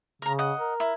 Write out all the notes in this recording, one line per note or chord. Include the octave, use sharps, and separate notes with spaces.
C#3 A#4 A#5
D#5 F#5
A#4
E4